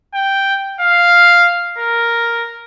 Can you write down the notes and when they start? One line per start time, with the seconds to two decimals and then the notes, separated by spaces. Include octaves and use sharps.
0.14 G5
0.81 F5
1.78 A#4